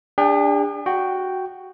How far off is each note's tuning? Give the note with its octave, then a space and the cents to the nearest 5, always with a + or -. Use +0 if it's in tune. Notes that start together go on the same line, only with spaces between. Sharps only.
D4 +0 G#4 -45 G5 +0
F#4 +0 G5 -5